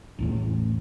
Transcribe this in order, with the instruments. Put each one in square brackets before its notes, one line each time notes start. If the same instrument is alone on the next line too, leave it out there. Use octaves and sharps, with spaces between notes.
[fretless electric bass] A1 E2 A2